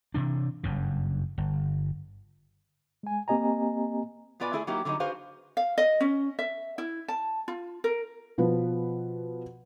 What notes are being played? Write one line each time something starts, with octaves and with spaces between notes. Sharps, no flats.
C3 E3 D4
F#1 G2 C#3
G1
G#3 G#5
A#3 C4 G4 D#5 G#5 A#5
B2 B3 F4 B4 D5 G#5
A3 E4 G#4 E5 G#5
F#3 A#3 D#4 E4 G4
D3 F#3 G3 C#4 D#4
F#4 G#4 B4 C5 F5
F5
D#5
C#4
E5
E4
A5
F4
A#4
B2 F3 B4